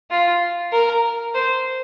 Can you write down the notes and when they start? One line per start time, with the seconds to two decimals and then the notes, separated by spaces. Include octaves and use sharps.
0.11 F4
0.72 A#4
1.34 C5